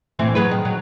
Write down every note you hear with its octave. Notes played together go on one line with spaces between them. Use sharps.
A2 E3 C4
F#3 G#4 B4
D#3
F#3